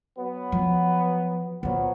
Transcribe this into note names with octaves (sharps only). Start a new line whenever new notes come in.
F#3 B3
F3
A#1 F3 F#3 B3 F4